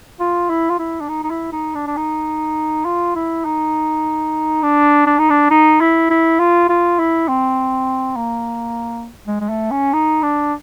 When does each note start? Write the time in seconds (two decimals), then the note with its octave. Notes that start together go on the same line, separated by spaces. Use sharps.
0.20 F4
0.50 E4
0.70 F4
0.79 E4
1.00 D4
1.09 D#4
1.24 D#4
1.30 E4
1.52 D#4
1.75 D4
1.87 D4
1.97 D#4
2.85 F4
3.16 E4
3.45 D#4
4.62 D4
5.06 D4
5.18 D#4
5.30 D4
5.50 D#4
5.81 E4
6.10 E4
6.39 F4
6.69 F4
6.99 E4
7.28 C4
8.16 A#3
9.27 G#3
9.41 G#3
9.49 A3
9.71 C#4
9.93 D#4
10.23 D4